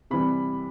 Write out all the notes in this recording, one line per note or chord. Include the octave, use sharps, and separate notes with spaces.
C3 E3 G3 B5